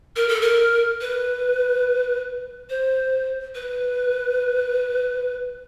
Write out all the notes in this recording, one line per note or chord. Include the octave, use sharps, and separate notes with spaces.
A#4
A4
A#4
B4
C5
B4